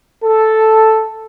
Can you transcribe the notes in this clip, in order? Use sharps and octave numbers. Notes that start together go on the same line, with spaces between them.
A4